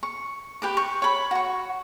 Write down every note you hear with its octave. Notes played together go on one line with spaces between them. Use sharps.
C#6
G4 B4 D6
C#6
C#5 B5
F#4 C#6